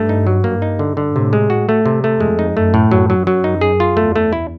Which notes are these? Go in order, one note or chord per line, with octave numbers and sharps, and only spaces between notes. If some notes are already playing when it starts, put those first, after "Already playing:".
Already playing: G2 A3
D#4
F#3
G2 A#3
D#4
D3
D3
A2 C3
G#3
F#4
A3
C3
A3
F2 G#3
D#4
F#2 A3
A2
F#2 F#3
F#3
F#3
D#4
G#4
F4
E2 A3
A3
E4